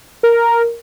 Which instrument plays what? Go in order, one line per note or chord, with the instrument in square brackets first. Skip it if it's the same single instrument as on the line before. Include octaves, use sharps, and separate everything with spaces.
[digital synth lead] A#4